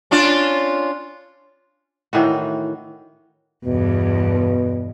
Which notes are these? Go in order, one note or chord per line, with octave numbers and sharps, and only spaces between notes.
C#4 D4 F4
A2 D#3 E3 F#4
E2 G2 B2